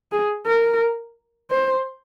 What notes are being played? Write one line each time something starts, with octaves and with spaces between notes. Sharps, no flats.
G#4
A#4
C5